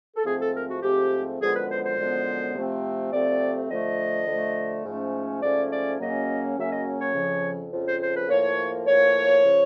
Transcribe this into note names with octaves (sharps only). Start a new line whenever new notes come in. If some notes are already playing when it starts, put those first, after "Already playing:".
A4
G#2 F3 A3 C4 G#4
A4
A#4
F#4
G#2 F3 A3 C4 G4
F#2 D3 F3 G#3 B3 G#4
B4
C5
C5
F#2 D3 F3 G#3 B3
C3 F3 A3 C4
C3 F3 A3 C4 D5
D3 F3 A3 D#5
D3 F3 A3
G#2 F3 A3 C#4
G#2 F3 A3 C#4 D5
D5
F#2 C#3 F#3 A#3 C#4 D#5
F#2 C#3 F#3 A#3 C#4 E5
D#5
C#5
F2 C#3 F3
F2 C#3 F3
C5
C5
B4
A2 F3 A#3 C#5
A2 F3 A#3 C#5
C#3 F3